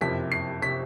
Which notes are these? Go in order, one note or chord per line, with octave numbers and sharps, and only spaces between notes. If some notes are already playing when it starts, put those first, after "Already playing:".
F#1 F2 C3 B6
C7
C3 B6